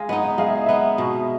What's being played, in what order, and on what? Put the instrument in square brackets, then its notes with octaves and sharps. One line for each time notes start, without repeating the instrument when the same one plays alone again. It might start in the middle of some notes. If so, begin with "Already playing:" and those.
Already playing: [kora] G#3 [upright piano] F5
[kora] B3 D#4 [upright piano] D#5
[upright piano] D#5
[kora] G#3 [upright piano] F5
[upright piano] E5
D#5
[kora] B3 D#4 [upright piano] E5
[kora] B2